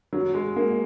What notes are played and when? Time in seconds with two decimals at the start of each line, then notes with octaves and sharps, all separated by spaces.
0.13 F#3
0.34 G#3
0.56 A#3